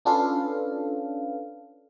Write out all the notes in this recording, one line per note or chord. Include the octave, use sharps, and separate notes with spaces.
C#4 D4 F4 A4 B4 F5